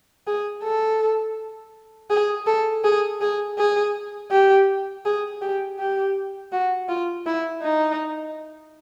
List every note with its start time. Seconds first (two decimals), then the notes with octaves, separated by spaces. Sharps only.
0.27 G#4
0.64 A4
2.10 G#4
2.47 A4
2.84 G#4
3.21 G#4
3.58 G#4
4.31 G4
5.05 G#4
5.41 G4
5.79 G4
6.52 F#4
6.89 F4
7.26 E4
7.62 D#4